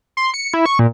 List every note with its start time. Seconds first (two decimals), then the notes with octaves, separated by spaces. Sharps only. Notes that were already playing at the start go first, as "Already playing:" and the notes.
0.17 C6
0.34 C#7
0.54 E4
0.66 C#6
0.79 A#2